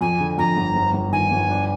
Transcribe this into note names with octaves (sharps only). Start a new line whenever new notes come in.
F2 G#5
D3
F2 A#5
G1
G1
G1
D#3 G#5
G1
D4